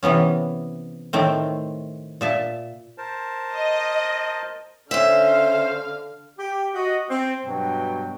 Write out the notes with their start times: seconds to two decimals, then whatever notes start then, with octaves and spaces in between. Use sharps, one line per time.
0.03 C3 E3 B3 C#4
1.13 A2 D#3 A3 C4
2.21 A#2 E5 A5
2.98 A#4 C5 A5
3.52 D#5
4.91 D3 C#4 C5 E5 F5
6.39 G4
6.74 F#4 D#5
7.10 C4
7.45 G2 B2 F#3 G5